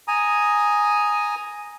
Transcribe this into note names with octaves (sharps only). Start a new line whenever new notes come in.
G#5 A#5 D#6